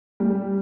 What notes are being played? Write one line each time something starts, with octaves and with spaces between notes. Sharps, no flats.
G3